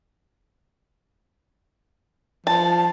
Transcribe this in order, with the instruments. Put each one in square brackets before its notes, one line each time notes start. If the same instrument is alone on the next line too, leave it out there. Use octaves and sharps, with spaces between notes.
[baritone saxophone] F3 [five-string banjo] A5